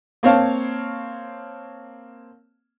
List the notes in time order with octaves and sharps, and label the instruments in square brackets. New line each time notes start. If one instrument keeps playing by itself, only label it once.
[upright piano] A#3 C4 C#5 F5 A5